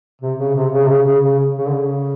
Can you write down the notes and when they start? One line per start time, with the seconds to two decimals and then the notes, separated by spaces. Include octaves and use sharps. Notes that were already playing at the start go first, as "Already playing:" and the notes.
0.22 C3
0.39 C#3
0.55 C3
0.73 C#3
0.86 C3
0.90 C#3
1.07 C#3
1.24 C#3
1.58 C#3
1.67 D3
1.74 C#3